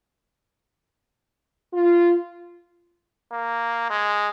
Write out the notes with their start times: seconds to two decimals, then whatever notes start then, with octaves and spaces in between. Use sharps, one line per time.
1.73 F4
3.32 A#3
3.90 G#3